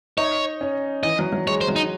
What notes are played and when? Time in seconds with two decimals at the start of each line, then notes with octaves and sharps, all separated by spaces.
0.18 D#4 C#5
0.61 C#4
1.03 E3 D#5
1.19 F#3
1.33 F#3
1.47 G#3 C#5
1.61 C5
1.68 F#3
1.76 D#4